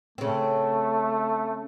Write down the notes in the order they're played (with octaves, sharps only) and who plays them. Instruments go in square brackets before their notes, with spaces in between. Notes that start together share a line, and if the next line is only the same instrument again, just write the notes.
[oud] C#3 C4 [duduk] A3